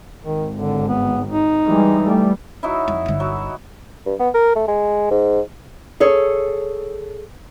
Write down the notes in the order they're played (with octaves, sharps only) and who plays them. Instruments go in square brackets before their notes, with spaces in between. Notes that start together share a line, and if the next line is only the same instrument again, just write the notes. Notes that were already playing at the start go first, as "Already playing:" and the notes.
[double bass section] G#1 [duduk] D#3
[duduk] D3
B3
D#4
[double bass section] E3 G3 G#3
G3 A3
[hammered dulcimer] F#3 D#4 E4
[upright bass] F2
G1 D3
[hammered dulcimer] F#3
[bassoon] G2
B3
A#4
A3
G#3
G#2
[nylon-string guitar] G#4 A4 C#5